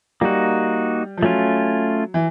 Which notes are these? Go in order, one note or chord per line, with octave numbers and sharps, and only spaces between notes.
G3 A#3 D#4 F#4
F3
F#3 A3 C#4 F4
E3